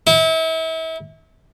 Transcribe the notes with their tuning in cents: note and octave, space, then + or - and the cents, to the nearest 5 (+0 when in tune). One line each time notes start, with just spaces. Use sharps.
E4 -35